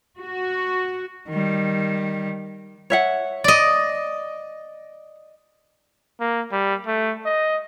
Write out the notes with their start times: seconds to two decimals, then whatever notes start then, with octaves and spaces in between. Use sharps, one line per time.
0.19 F#4
1.29 D#3 G3
2.90 C#5 E5 F#5
3.44 D5 D#5
6.21 A#3
6.52 G3
6.87 A3
7.26 D#5